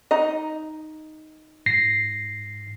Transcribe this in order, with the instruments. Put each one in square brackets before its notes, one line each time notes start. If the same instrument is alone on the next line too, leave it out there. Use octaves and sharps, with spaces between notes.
[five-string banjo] D#4 D#5
[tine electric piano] G#2 A#6 C7